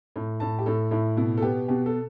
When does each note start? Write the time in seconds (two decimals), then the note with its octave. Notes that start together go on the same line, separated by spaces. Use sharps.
0.16 A2
0.40 A2 A5
0.59 G4
0.66 A2 A4
0.91 A2 E4
1.17 B2 E4
1.38 A4
1.42 B3 G4
1.68 B2 G4
1.86 A4